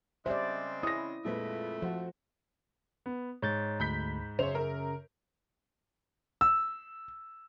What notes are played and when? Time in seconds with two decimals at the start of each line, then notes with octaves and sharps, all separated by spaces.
0.26 C#3 G3 G#3 C4 C5 D5 E5
0.83 C#4 E4 D#6 A#6
1.25 F2 A#2 G#3 A3 B4
1.82 F3 F#4 C5
3.06 B3
3.42 G#2 C#5 G6 A6
3.80 D2 B5 G6 B6
4.39 F#2 C#3 C5 C#5 F7
4.55 A#4
6.41 E6